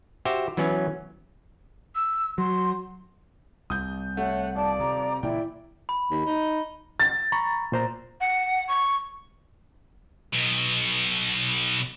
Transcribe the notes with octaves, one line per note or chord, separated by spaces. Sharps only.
F#4 G4 C5 E5
E3 F#3 B3 C#4
E6
F#3 C6
C2 D#6 G6
A3 C#5 F#5
D#1 D5 A5
C3 A#5
A#2 C#3 E3 E4 D5 G5
B5
D#2
D#4
A6
A#5 B5 C#6
A#2 C5 A#5
F#5
C#6
B1 B2